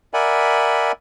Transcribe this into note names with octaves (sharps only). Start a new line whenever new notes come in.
A#4 D5 E5 F#5 G#5 B5